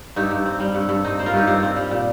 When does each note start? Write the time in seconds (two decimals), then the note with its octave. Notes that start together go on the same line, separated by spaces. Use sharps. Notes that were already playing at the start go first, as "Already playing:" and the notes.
0.16 G2 D#4 G4
0.31 G2
0.46 C4
0.60 G3
0.75 G2
0.89 G2
1.04 C4 D#4
1.19 G3 C5
1.26 F4 A#4
1.33 G2 D#4 G4
1.47 G2 C4 F4
1.63 C4
1.76 G3
1.91 A#2